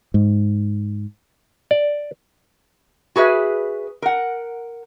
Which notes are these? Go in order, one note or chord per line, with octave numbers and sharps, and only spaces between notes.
G#2
D5
F#4 G#4 B4 E5
A#4 F#5